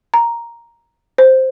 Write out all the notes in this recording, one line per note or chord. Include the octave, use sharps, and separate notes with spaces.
A#5
C5